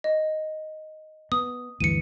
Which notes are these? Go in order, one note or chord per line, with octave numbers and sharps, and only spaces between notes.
D#5
B3 D#6
D2 G2 E3 C#7 D#7